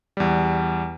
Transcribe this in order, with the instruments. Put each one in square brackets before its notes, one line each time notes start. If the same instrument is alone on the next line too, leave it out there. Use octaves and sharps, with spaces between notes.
[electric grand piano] E2 G3